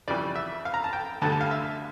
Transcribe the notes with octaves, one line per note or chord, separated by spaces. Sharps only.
F2 C#3 E3 G3 D5
E5
F5
A#5
A5
G5
D2 D3 G3 A5
A5
F5
E5